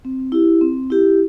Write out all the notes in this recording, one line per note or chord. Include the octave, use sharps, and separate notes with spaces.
C4
E4 G4
C4
E4 G4